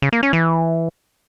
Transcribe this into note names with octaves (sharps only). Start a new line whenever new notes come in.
C#3
A#3
C#4
E3